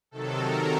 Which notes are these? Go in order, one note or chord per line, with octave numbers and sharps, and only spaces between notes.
C3 D#3 F#3 A4
A#4